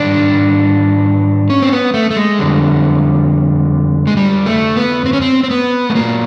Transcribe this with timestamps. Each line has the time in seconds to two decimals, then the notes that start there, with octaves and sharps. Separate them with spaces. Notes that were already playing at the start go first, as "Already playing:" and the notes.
Already playing: G#2 D#3 G3 D4
1.50 C#4
1.62 C4
1.72 B3
1.94 A3
2.11 A3
2.17 G#3
2.39 F2 D3 G3
4.07 G#3
4.17 G3
4.46 A3
4.77 B3
5.06 C4
5.13 C#4
5.22 C4
5.44 C4
5.51 B3
5.90 A3
5.95 A#2 F#3 A#3